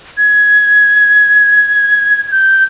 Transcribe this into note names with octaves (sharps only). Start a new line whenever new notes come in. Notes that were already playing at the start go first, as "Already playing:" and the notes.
G#6
G6